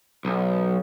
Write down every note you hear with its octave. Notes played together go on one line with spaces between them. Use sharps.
B1